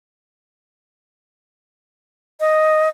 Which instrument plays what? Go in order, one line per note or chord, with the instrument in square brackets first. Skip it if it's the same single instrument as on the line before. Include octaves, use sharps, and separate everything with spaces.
[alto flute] D#5